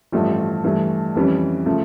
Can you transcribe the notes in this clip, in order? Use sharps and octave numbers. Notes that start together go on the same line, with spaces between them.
A1 G2 F3 A3
G2 E3 A3
F2 E3 G3 C#4
C#3 F3 A3